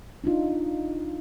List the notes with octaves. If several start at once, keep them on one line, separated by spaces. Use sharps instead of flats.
D4 D#4 F4